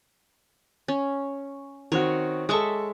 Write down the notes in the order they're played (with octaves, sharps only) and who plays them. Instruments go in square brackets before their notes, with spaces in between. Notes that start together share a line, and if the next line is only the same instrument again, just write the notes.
[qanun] C#4
[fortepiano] D#3 C4 F#4 [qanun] C#5
[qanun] G#3 E5 C#6 [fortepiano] A4 D#6